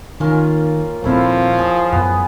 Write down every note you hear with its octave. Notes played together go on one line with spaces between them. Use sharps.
D#3 A#3 C#4 F4
D#1 F3 A3 C4 E4 F4
G#4
F#2 B3